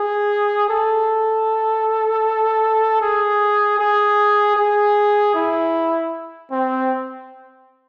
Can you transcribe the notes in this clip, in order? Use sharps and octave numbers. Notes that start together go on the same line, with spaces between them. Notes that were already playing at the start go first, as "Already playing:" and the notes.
Already playing: G#4
A4
G#4
G#4
G#4
E4
C4